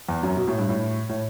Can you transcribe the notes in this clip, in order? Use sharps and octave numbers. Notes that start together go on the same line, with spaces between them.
E2
F#2
B2
A2
G2
A2
A2